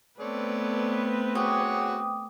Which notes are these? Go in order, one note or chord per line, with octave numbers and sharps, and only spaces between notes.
A3 B3 C4 A4 B4 C#5 D5
F#4 G#4 C#5 G5 D6 D#6